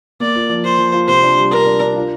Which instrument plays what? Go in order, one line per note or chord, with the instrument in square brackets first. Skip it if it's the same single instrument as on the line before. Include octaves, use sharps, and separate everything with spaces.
[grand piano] A#3 [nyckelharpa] D5
[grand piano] F4
F3
[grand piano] F4 [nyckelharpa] C5
[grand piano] F3
F4
[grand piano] C3 [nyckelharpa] C5
[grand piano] D4
G3
[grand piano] D4 [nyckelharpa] A#4
[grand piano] D4
D4
F4